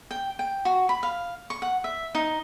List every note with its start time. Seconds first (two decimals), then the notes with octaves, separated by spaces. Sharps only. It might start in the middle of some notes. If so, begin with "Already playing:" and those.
0.11 G5
0.39 G5
0.65 F#4
0.89 B5
1.03 F5
1.50 C#6
1.62 F#5
1.84 E5
2.15 D#4